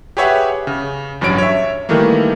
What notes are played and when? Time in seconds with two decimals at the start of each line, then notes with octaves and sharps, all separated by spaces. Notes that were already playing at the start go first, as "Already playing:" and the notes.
0.17 G4 G#4 B4 C#5 E5 F#5
0.67 C#3
1.21 A1 G2 F#3 C#4 C#5 D7
1.38 C#5 E5
1.89 D#3 E3 G3 A3 A#3